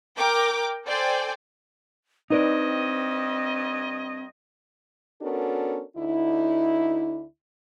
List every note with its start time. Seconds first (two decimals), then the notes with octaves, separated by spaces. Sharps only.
0.18 A#4 G5 D6
0.86 A4 C5 D5 G5 G#5
2.30 G2 C4 D#4 B4 D5 D#5
5.22 B3 C#4 D4 F#4 A4 A#4
5.97 D2 D3 D#4 E4